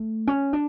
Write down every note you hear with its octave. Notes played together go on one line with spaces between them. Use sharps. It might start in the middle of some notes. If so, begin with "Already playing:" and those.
Already playing: A3
C#4
D4